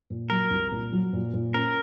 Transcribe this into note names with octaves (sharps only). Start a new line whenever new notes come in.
A#2
F#3 A#4
C2
A#2
F#3
A#2
A#2
C#4 A#4